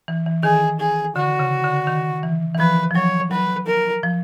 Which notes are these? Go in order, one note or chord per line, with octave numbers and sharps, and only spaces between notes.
E3
E3
D#3 G#4
G#4
D3 F#4
C#3
D3
D#3
E3
E3
F3 B4
F3
F#3 C#5
F#3 B4
A#4
F3